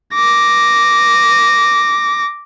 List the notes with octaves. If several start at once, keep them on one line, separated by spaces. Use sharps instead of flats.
D6 A#6